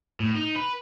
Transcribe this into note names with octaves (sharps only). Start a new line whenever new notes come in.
A2
D#4
B4